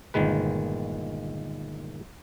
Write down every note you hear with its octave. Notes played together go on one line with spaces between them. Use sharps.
G1 A#2 D#3 G#3 B4